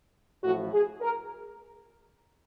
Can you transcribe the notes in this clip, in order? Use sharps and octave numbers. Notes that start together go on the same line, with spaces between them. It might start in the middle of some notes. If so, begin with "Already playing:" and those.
A1 A2 F3 F#4
G#4
A#4